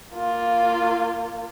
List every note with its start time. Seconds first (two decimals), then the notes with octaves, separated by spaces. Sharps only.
0.15 A#3 F4